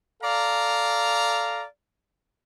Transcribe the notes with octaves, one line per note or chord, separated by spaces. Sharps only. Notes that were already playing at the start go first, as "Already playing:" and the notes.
A4 D5 F5 A#5